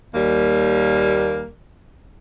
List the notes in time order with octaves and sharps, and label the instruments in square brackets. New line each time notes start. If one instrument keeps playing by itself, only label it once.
[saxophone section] D#2 G3 A#3